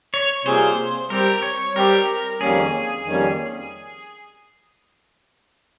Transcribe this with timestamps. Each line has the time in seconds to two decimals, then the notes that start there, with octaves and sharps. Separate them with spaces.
0.14 C#5
0.45 C3 G3 A#3 F4 G#4 C5
1.10 G3 C4 G4 A#4
1.42 C#5
1.75 G3 C4 G4 A#4
2.40 F2 D#3 G3 A#3 C#4 G#4
3.06 F2 D#3 G3 A#3 C#4